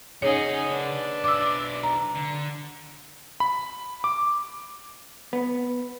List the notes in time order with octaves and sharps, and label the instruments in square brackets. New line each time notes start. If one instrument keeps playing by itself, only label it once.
[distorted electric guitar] C#3 F#5 [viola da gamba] C#4 D#4 G#4 [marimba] C#5
[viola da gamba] D4 B4
[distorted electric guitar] B1 D5 [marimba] D6 E6
[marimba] A#5
[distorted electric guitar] D3
[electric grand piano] B5
D6
[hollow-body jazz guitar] B3